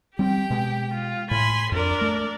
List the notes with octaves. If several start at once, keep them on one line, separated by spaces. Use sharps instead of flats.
G3 C4 G4 G5
B2 G#3
F4
A2 G#5 B5 C6
F2 D4 A#4 D5
A3